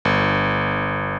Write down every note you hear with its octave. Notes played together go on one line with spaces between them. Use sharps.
G1